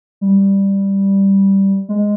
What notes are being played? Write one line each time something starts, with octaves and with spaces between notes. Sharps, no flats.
G3
G#3